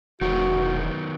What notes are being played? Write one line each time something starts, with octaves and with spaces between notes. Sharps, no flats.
E1 D#3 F#3 B3 F#4